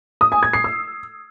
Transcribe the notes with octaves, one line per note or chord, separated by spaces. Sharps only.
D#6
G#5
G#6
C7
E6